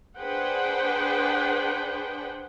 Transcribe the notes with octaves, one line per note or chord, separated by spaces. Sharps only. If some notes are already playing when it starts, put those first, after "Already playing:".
D4 G#4 B4 C5 F#5 G5